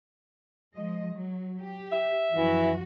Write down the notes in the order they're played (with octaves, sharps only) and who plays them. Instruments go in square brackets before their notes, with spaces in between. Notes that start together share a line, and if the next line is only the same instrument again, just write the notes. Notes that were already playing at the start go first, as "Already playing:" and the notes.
[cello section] F3 G#3 D#5
F#3
G4
[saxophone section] E5
[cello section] F#2 F3 F#4 [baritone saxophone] E3